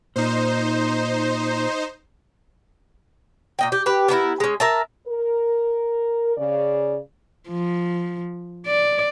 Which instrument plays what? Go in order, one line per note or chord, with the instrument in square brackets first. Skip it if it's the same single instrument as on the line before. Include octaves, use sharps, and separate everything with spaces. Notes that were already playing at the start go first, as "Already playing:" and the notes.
[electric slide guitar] A#2 [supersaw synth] D#4 C5
[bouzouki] A#2 D#5 G5
G4
G4 B4
B3 D4 E4 A#4
G#3 C#4
A#4 E5 A5
[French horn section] A#4
C#3 D5
[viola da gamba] F3
D5